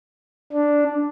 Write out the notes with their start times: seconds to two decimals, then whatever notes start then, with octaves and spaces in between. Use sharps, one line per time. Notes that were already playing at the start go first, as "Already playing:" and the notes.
0.53 D4